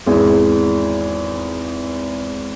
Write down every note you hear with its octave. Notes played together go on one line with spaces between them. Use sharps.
G#1 E2 E4 G#4